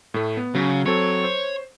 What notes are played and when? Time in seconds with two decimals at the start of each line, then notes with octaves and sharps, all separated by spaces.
0.14 A2 A3
0.37 B3
0.55 C#3 F#3
0.86 F#3 C4 A4 C#5
1.24 C5